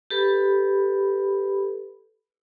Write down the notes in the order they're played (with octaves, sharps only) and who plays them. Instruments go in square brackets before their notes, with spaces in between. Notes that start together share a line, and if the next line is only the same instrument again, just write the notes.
[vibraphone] G4 A4 B4 B5